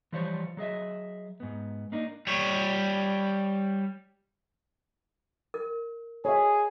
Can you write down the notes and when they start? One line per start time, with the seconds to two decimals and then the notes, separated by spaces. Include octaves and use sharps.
0.13 E3 F3 G3 F4 C5 C#5
0.57 F#3 G#4 D#5 E5
1.40 G#2 B3
1.92 A#3 D4 D#4
2.27 G3 C#5
5.54 A#4
6.25 G#4 C#5 D#5 E5